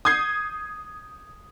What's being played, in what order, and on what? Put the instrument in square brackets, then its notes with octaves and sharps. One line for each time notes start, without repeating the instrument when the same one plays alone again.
[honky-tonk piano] D#6 G6 G#6 C7